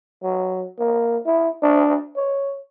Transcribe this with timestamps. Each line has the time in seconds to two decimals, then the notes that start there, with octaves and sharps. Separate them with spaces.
0.23 F#3
0.79 A#3
1.26 E4
1.63 D4
2.16 C#5